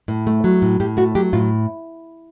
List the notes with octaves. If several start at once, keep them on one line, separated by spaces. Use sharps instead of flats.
A2
A3
F#3
A2
A2 G4
A3 F#4
F#3 G4
A2 F4